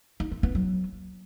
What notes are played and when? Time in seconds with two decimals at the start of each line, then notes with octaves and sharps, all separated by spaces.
0.20 D#4
0.32 C4
0.43 B3
0.55 F#3